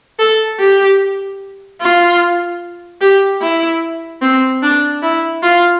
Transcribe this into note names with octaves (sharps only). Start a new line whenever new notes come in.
A4
G4
F4
G4
E4
C4
D4
E4
F4